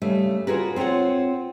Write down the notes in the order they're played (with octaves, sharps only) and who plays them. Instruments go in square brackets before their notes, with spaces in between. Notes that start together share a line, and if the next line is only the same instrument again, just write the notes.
[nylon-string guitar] C#3 G3 A3
F4 F#4 G#4 A#4 B4
C4 F4 B4 C#5 F#5